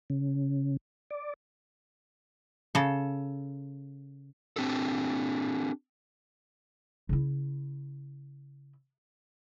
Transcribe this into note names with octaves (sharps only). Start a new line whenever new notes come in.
C#3
D5
C#3 A4
C4 D4 G4 A4
C#3 E4